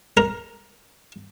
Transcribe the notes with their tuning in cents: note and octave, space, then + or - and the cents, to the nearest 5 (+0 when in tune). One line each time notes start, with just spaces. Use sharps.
A#4 +10